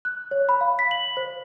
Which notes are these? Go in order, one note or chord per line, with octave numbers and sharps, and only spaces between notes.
F#6
C#5
B5
F5
B6
F#7
C5